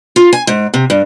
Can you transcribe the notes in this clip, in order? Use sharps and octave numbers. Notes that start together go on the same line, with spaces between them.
F4
G#5
G#2
C3
G2